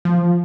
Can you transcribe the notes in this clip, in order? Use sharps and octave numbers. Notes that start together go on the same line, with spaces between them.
F3